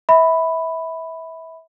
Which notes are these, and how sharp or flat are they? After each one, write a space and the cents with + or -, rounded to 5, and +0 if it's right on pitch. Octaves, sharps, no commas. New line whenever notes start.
E5 -25 B5 +5